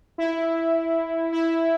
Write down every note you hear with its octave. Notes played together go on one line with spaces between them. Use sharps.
E4
E4